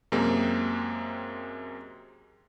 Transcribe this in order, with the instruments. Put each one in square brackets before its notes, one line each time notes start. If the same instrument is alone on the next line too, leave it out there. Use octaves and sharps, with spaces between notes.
[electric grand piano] F#2 C3 G#3 A#3 C4